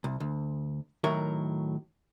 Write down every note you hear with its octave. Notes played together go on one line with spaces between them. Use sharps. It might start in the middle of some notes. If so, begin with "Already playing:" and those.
C2
D2
A2 D#3 F#3 A#4 C#5 E5